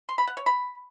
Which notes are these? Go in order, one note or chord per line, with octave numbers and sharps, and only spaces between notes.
C6
B5
F#5
C#5
B5